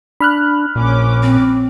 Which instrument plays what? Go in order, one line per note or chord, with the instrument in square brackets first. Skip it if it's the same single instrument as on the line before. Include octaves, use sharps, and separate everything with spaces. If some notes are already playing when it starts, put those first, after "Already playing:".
[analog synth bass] D4 [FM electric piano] B5 F6 F#6
[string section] A#1 C#4 D6 [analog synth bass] A#2
[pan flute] C4